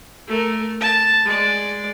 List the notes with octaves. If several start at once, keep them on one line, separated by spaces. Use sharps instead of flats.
A3 A#4
A5
G#3 D5